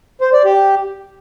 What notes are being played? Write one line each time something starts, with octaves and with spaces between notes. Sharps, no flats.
C5
D5
G4